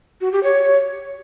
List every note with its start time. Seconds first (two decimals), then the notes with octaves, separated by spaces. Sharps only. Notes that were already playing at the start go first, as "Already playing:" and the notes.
0.21 F#4
0.32 G4
0.43 C#5